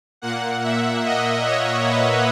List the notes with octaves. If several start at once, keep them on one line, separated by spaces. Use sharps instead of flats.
A#2 A#3 F#5
E5
D#5
C#5
B4